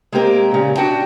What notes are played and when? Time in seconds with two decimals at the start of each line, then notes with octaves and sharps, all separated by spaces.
0.12 G#3 A#3 C4 G4 A#4
0.51 A#2 C#3
0.76 D4 F#4 G5 A5